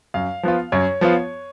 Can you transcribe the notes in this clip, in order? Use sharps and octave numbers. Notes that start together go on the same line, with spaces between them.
F#2 F5
F3 B3 F4
F#2 C#5
F3 B3 F4